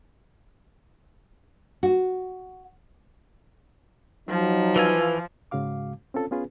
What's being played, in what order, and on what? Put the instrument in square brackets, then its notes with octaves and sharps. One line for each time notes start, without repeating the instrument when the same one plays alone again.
[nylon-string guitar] F#4
[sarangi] F3 [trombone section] F#3 D#4
[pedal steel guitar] E3 F4 G#5 [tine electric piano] B4 E6
[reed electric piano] G#2 C#3 G#3 F#4 F5 D6
C4 C#4 F4 A4
B3 C#4 F4 G#4 B4